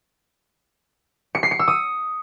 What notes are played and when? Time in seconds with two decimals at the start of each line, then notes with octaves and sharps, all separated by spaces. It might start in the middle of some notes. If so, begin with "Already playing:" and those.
1.35 C#7
1.43 C7
1.51 C#7
1.59 E6
1.68 D#6